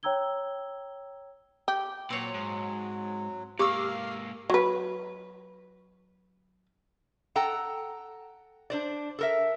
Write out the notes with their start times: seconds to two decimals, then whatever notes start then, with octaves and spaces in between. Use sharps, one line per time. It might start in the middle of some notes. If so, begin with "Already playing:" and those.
0.03 C#5 G5 A#5 E6 G#6 G7
1.68 G4
2.10 A#2 F#3 C4 C#5
2.34 G#2
3.59 G#2 A#3 G4 F5 D6 E6
4.50 F#3 B4
7.36 A4 F#5 G5 A#5
8.70 D4 C5 D5
9.19 A4 A#4 E5